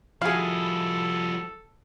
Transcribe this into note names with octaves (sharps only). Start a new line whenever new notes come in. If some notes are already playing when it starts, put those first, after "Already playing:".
F3 G3 E4 F#4 G#4 A4 F5